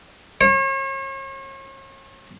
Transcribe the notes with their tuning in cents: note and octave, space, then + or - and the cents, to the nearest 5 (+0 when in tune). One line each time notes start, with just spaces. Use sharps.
C#5 -40